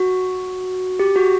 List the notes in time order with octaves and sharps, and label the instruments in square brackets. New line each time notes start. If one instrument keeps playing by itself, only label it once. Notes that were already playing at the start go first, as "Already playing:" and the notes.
Already playing: [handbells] F#4
G4
F#4